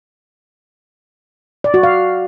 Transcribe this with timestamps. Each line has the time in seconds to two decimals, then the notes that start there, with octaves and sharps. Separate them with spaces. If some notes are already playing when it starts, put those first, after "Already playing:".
1.64 D5
1.74 F#4
1.83 F5